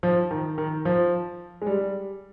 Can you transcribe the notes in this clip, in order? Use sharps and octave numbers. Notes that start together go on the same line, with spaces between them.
F3
D#3
D#3
F3
G#3
G3